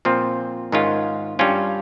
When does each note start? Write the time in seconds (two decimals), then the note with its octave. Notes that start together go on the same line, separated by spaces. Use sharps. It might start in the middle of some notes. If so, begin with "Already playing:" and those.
0.05 A#2 F3 C4 F4
0.72 G#2 D#3 G#3 C#4 F4
1.39 G2 G3 C#4 F4